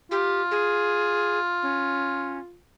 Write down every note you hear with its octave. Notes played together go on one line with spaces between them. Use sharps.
F4 G4
G#4
C#4